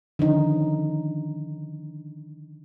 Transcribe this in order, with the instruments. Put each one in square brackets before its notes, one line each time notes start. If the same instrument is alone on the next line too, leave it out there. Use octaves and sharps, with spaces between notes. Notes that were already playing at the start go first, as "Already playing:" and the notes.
[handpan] D3 D#3 F3 C#4 D#4